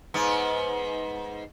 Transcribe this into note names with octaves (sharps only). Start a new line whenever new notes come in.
G#2 B3